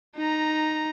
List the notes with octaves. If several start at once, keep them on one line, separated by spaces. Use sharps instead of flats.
D#4 A#5